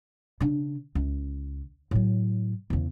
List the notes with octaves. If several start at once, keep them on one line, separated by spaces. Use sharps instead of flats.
C#3 D4
C#2
A2 F#3
E2 C#3